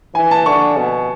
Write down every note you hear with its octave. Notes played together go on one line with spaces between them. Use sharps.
E3 G#5
A5
D3 C#6
B2